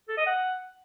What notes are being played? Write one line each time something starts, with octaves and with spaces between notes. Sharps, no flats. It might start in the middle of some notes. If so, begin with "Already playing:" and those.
A4
D#5
F#5